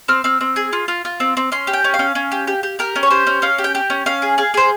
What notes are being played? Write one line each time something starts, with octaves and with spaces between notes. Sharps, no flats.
C4 F6
C4 F6
C4
G#4
F4
F4
F4
C4
C4
C#4 C6
G4
G5
C#4
F5
C#4
C#4
G4
G4
G4
G4 A#4
C#4
C#5
G4 C5
C#4
C#4 F5
G4
G5
G4
C#4
C#4 F5
G#4
G#4 F5
G#4 C5